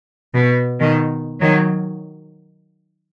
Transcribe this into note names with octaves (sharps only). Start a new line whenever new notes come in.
B2
B2 D#3
D#3 F#3